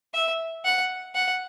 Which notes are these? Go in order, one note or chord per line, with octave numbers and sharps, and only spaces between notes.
E5
F#5
F#5